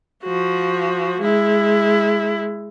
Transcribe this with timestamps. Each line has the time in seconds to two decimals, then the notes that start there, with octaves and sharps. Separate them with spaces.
0.24 F3 F#4
1.20 G#3 E4